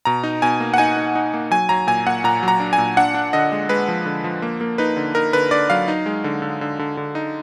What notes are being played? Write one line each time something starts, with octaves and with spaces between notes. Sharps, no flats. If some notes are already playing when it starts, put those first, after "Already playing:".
B2 A#5
D#4
B2 G#5
A#3
F#5
D#4 G#5
D#4
D#4
A#3
F#3 G#5
F#3 A#5
A#2 G#5
A#2 F#5
A#2 A#5
F#3
A#5
D4
G#5
A#2
D4 F#5
D4
D3 D#5
G#3
G#3 B4
F3
D3
F3
A#3
A#3
D#4 B4
D3
D#4 A#4
D3 B4
D3 D5
F#3 F5
D#4
G#3
D3
D3
D3
D3
D3
D#4